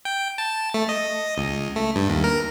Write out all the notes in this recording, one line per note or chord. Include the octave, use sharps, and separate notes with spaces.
G5
A5
A3
D#5
C#2
A3
G2
D#2
A#4